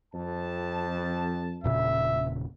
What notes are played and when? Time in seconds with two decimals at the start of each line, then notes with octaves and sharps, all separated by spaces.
0.13 F2 A5
1.64 E1 A#2 C#3 E5